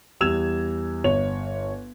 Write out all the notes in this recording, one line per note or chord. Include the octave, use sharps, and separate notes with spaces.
E2 G3 E6 G#6 E7 F7
G1 C#5 F7